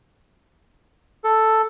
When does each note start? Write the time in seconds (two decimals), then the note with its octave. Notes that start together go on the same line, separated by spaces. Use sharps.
1.24 A4